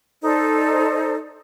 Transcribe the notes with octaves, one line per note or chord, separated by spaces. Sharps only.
D#4 A4 C5 D5